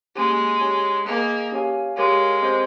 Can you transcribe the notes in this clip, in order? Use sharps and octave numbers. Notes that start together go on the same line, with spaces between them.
G#3 A#3 C#4 G4
C#4 G4 C#5 G#5
A#3 G#4 D#5 G#5
C#4 G4 C#5 F5 G#5
G#3 G4 A#4 C#5 F5
C4 G4 C5 D#5